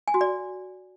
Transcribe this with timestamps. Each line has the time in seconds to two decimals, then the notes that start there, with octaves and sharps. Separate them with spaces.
0.08 G#5
0.14 F#4
0.21 D5